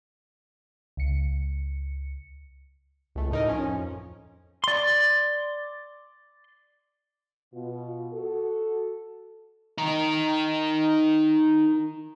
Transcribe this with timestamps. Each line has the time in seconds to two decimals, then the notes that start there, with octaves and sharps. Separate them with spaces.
0.97 C#2 C#7
3.15 C#2 A3
3.31 A2 D#4 A#4
3.48 F3 C#4
3.67 F2
4.64 D5 C6
7.54 B2 F4
8.13 F#4 A4
9.78 D#4 A#4